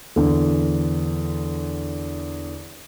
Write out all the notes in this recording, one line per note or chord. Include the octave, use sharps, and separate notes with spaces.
E2 D3